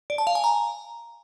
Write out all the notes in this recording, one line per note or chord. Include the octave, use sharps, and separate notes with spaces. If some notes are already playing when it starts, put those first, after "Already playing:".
D5
A5
F5
G#5
A#5